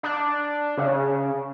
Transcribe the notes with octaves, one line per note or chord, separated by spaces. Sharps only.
D4
C#3